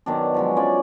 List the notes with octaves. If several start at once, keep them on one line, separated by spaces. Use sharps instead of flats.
B2 D#3 F#3 D4
F3 F#3 G#3
F#3 C#4 F4 D5